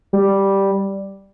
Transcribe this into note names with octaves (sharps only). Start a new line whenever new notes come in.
G3